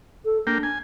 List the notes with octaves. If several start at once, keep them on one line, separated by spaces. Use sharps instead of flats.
A4
A#3 D4 G5
G#5